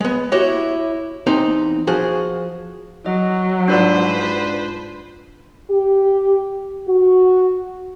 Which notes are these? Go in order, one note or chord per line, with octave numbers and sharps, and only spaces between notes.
G#3 B3
E4 F#4 G4 C#5 D#5
E2 C4 D#4 A#5
F3 F#4 G#4 C5
F#3 D#5
G#2 D4 F4 B4 C5 D5
G4
F#4